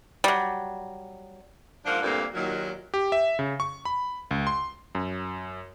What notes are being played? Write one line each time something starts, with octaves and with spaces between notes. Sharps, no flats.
F#3 G3
G#2 F3 A#3 D4 F4 F#5
D2 G2 A#2 D3 A#3 C4
D#2 A#2 D#3 F#3
G4
E5
C#3
C#6
B5
C#2
C6
F#2